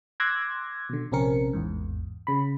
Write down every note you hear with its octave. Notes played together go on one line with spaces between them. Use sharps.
C6 D6 E6 F#6 G#6 A#6
B2 D3
A#1 C3 C4 C#4 A#4 C#7
A1 E2 G#2
C#3 B5